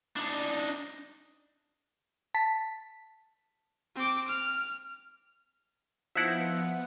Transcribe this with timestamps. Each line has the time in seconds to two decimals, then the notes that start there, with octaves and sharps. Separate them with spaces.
0.16 D4 D#4
2.34 A5 B6
3.96 C4 D6
4.28 F6
6.15 F3 B3 D#4 E4 E5 F#5